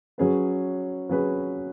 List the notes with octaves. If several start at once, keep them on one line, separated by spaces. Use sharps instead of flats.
F#3 C#4 G#4 B4
F#3 C#4 G#4 B4